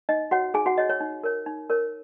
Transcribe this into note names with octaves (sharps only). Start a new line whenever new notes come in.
D#4 D#5
F#4 C#5 F#5
D#4 G#4 G#5
F#4 F#5
F#4 C#5 D#5
C#5
D#4
A#4 C#5
D#4
A#4 C#5